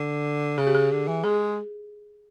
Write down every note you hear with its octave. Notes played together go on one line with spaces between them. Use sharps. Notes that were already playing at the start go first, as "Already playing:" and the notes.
Already playing: D3
C#3 G#4
G4
G#4
D3
E3
G#3 G#4